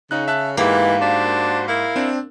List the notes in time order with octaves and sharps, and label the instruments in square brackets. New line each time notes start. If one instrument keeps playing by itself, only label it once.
[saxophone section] C#3 [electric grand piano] D#4 F#6
[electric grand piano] E5 A5 F#6
[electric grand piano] G#2 G4 [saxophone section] E3 G#3 B3 [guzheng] A#3
[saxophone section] D4 F#4 C5
E4 A#4 F5
[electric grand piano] C4 D4